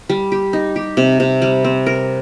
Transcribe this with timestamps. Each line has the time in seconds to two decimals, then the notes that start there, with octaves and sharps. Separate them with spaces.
0.09 G3
0.32 G4
0.53 D#4
0.76 G4
0.97 C3
1.20 C3
1.42 G3
1.64 C4
1.86 A#4